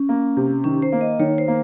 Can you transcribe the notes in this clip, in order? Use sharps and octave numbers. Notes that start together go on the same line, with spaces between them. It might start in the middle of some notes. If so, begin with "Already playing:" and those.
Already playing: C#4
A#3
C3
D#3 C#4
C5
A#3
D#5
D#3 C#5
C5
A#3